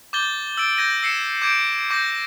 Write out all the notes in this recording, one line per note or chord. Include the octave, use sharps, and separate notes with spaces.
D6 G6 A6 G7
E6 A6 D7
G6 G#6 A#6 D#7
E6 C7 C#7 E7
D6 G6 G#6 D7
D6 G6 A#6